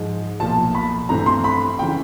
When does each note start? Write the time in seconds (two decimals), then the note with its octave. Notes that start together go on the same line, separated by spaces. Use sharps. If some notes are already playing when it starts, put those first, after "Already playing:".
Already playing: G#2 F3 G#3
0.40 B1 A#2 F3 A5
0.75 B5
1.09 G2 E3 A3 C4 A#5
1.26 C6
1.44 B5
1.79 C#3 E3 G5